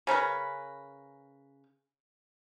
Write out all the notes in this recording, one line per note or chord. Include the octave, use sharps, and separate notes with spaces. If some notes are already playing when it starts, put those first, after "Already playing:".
C#3 C#4 A#4 B4